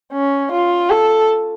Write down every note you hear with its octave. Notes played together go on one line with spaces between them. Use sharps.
C#4
F4
A4